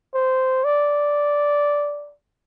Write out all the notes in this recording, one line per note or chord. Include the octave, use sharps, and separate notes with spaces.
C5
D5